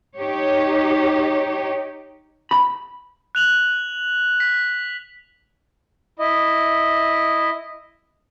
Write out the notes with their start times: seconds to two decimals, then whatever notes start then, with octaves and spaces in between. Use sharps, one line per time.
0.17 D#4 G4 C#5
2.51 B5
3.35 F#6 F7 F#7
4.40 B6
6.19 E4 D#5